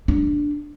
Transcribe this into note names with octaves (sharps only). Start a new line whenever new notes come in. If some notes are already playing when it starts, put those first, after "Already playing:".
D4